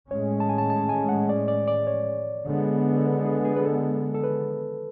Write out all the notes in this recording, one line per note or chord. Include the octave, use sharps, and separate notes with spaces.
A2 G#3 C#4 C#5
A5
G#5
A5
A5
G#5
F#5
D5
D5
D5
C#5
D3 G#3 B3
A4
B4
G#4
G#4
B4
A4
A4
B4